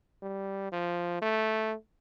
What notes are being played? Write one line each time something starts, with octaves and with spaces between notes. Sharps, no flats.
G3
F3
A3